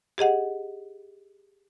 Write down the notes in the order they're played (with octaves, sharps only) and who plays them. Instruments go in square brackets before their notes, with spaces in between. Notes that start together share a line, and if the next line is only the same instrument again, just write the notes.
[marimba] G4 G#4 D#5 F#5